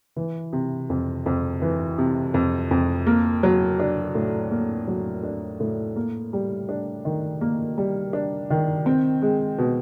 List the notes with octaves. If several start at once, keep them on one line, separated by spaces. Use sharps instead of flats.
E3
C3
F2
F2
E3
C3
F2
F2
A#3
F#3
D4
A2
A#3
F#3
D4
A2
A#3
G3
D4
D#3
A#3
G3
D4
D#3
C4
G#3
B2